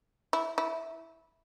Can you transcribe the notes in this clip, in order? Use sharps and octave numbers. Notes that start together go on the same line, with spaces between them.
E4
E4